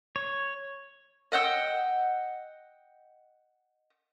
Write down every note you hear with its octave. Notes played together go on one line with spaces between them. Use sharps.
C#5
D#5 F#5 G5 E6